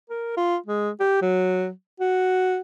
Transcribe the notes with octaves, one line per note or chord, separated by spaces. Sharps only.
A#4
F4
G#3
G4
F#3
F#4